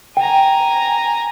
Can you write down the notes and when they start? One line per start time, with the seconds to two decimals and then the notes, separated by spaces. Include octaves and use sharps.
0.17 G5 G#5 A#5